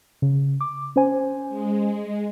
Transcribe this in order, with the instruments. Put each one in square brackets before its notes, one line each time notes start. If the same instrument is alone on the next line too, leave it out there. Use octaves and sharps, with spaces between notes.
[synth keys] C#3
D6
C#4 C5 G#5
[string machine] G#3